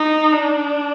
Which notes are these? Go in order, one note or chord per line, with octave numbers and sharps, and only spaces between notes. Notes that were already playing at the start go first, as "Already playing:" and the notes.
Already playing: D#4
D4